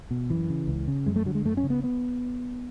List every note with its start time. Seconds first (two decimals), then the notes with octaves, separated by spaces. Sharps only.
0.11 B2
0.30 F#2 E3
0.49 C#3
0.68 C#2
0.88 C#3
1.06 F#2 G#3
1.16 A3
1.26 D3 F#3
1.35 G#3
1.45 F#2 A3
1.57 C#4
1.64 C#3
1.70 B3
1.84 B3